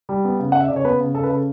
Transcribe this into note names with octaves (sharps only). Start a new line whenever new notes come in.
G3
B3
C#3
C#3 F#5
E5
C#3 D5
C#5
B3 B4
C#3
C#3 A4
B4
C#3 A4